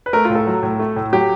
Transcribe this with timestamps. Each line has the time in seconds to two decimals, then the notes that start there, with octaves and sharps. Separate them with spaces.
0.06 B4
0.13 A3 A#4
0.25 A2 F4
0.35 A4
0.46 F#3
0.63 A2
0.80 A3
0.96 A2
1.13 F#3 G4